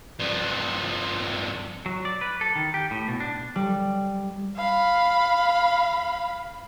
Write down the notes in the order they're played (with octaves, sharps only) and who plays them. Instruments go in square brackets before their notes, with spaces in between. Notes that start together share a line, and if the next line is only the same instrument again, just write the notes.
[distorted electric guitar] G2 F3
[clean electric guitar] F#3
D5
B4
A4
D#3
G4
A2
B2
D4
[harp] G3
[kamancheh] F5 B5